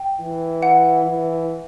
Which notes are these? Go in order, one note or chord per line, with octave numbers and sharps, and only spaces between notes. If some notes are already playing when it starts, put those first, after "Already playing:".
Already playing: G5
E3
F#5
E3